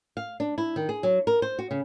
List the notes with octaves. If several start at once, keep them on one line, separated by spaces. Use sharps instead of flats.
F5
D4
E4
D#3
G#4
F#3
A#4
C5
F#4
C#3